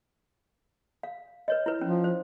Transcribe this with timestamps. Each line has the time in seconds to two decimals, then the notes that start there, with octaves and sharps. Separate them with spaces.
1.03 F5
1.48 B4 C#5 D#5
1.66 E4 B4
1.81 F3 C#4
2.04 C5